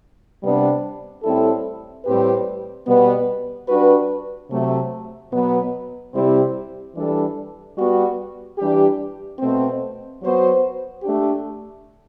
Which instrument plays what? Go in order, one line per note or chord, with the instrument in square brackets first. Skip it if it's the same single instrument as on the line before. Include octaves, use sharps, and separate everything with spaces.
[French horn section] C3 G3 B3 D4
A2 G3 C4 E4 A4
A2 G3 C4 G4 B4
B2 G3 B3
G3 D4 F#4 B4
C3 F#3 A3
B2 F#3 B3
C3 G3 C4 E4 G4
E3 G3 D4 A4
G3 B3 F#4
E3 G3 D4 G4
B2 A3 C4
F#3 B3 F#4 C5
A3 D4 G4